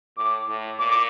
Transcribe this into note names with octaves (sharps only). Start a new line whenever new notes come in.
A2 D6
A2
A#2 D6
D6